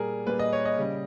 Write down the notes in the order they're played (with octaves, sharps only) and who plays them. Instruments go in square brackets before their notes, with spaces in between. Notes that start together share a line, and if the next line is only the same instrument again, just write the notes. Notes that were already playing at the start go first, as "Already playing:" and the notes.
Already playing: [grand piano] A#2 G3 G#4 A#4
A#2 G3 B4
D#5
C#5
D#5
C#3 G3